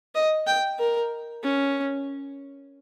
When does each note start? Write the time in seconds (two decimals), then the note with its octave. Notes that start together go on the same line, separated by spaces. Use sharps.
0.15 D#5
0.47 G5
0.79 A#4
1.43 C#4